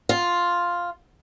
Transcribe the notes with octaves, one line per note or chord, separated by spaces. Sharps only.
F4